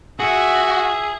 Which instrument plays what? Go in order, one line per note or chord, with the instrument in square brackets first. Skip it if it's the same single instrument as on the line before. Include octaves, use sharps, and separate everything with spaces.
[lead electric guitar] F#4 [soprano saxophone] G#4 [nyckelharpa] E5